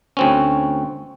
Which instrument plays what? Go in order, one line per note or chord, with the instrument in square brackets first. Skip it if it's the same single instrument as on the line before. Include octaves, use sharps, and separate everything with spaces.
[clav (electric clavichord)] D2 C4 C#4